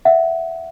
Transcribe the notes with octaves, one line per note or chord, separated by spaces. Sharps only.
E5 F#5